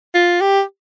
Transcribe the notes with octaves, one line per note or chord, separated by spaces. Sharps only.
F4
G4